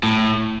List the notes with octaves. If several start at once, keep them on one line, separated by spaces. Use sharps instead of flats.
A2